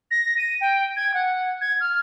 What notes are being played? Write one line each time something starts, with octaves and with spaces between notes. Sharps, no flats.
A#6
D#7
G5
G#6
F#5
G#6
F6